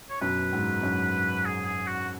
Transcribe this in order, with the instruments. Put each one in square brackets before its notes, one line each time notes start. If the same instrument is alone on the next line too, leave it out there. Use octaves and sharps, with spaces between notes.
[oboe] C#5
[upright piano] F#2 B2 [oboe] B4
[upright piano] G#2
F#2
[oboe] G#4
G#4
F#4